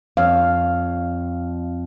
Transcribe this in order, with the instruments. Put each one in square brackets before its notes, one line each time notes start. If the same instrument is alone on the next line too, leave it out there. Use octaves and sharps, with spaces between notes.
[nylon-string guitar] F2 [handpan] C#5 F5